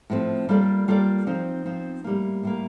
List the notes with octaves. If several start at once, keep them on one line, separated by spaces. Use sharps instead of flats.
A2 F3 C4
G3 A#3 F4 A4 D5
G3 A#3 F4 A4 D5
F3 C4 D#4
F3 C4 D#4
A2 G3 A#3
A2 G3 A#3